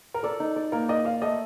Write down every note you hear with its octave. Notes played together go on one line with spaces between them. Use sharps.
A#4
A4 D5
D#4
D5
A#3 A#4
D5 D#5
D5 F5
A3 D#5